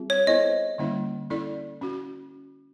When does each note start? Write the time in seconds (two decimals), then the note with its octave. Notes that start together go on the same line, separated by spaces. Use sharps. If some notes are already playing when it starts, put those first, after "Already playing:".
Already playing: G3 C4 F4 G#4
0.10 C#5
0.27 B3 E4 A4 C5 D#5
0.78 D3 G3 A#3 C#4 E4
1.30 C#4 E4 A4 D5
1.81 C#4 F#4